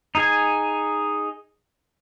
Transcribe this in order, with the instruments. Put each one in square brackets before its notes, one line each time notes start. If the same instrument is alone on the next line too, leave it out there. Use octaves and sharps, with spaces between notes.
[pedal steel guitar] D#4 G#4 G#5